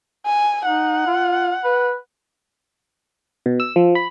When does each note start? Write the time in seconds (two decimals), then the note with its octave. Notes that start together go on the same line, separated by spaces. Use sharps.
0.26 G#5
0.65 D#4 F#5
1.07 F4
1.64 B4
3.46 B2
3.60 E6
3.76 F3
3.95 B5